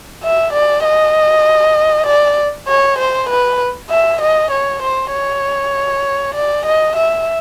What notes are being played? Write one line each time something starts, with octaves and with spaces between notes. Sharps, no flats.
E5
D5
D#5
D5
C#5
C5
B4
E5
D#5
C#5
C5
C#5
D5
D#5
E5